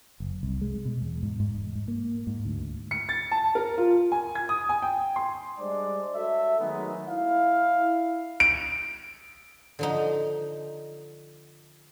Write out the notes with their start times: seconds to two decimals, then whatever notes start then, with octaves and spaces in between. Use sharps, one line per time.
0.20 F#1
0.43 C2
0.61 G#3
0.85 B2
1.02 E2
1.23 G#2
1.40 G#2
1.55 E1
1.75 G#2
1.88 A#3
2.27 G#2
2.45 D2
2.91 C#7
3.09 A6
3.32 A5
3.55 A#4
3.78 F4
4.12 G#5
4.35 G#6
4.49 D#6
4.69 G#5
4.82 G5
5.16 C6
5.59 G3 G#3 D4 C5 D5
6.14 F#4 A4 C#5 E5
6.60 D#3 F#3 G#3 A3 B3 D#4
7.07 E4 F5
8.40 D7
9.79 D3 F3 D#4